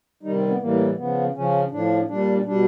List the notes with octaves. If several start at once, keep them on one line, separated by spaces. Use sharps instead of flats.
C3 D#3 G3 D#4
C4
B3
A2 E3 G3 A#3
C#3 F3 B3
C#3 F3 C#4
A2 F3 D4
A#2 G3 D4
B2 G3 D4